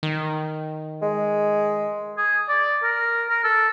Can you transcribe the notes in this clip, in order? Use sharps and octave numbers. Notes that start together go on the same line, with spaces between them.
D#3
G#3
G#4
D5
A#4
A#4
A4